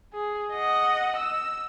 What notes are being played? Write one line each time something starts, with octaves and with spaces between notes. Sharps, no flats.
G#4
D#5 F#5
E6